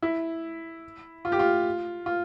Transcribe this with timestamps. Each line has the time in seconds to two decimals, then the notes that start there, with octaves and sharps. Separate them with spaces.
0.02 E4
1.25 F4
1.32 G4
1.39 F4
2.06 F4